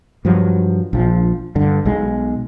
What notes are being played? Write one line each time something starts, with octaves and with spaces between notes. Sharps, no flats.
G2 F3 F#3
A#1 F3
G2 D3
B1 G#3